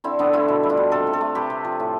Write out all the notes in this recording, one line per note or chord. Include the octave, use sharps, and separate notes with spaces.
D3 C4 E4
D3 B3 D4
A3 C4 E4
B2
G3
D4 F4
B2
C3 F4 A4
C3
F4 A4
A3
C3 G4 B4
C3
F3
A2